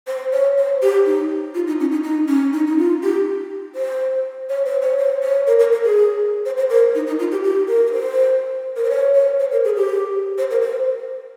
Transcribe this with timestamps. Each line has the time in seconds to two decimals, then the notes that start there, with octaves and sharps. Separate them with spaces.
0.07 C5
0.32 C#5
0.57 C5
0.82 G4
1.06 D#4
1.54 F4
1.67 D#4
1.80 C#4
1.91 D#4
2.04 D#4
2.28 C#4
2.53 D#4
2.67 D#4
2.78 F4
3.03 G4
3.75 C5
4.49 C#5
4.66 C5
4.82 C#5
4.98 C5
5.22 C#5
5.47 A#4
5.59 A#4
5.72 A#4
5.84 G#4
6.45 C5
6.57 C5
6.70 A#4
6.95 D#4
7.07 D#4
7.19 F4
7.31 G4
7.44 G4
7.68 A#4
7.87 A#4
7.93 C5
8.76 A#4
8.84 C5
8.90 C#5
9.15 C#5
9.40 C5
9.52 A#4
9.64 G#4
9.77 G4
10.38 C5
10.51 A#4
10.62 C5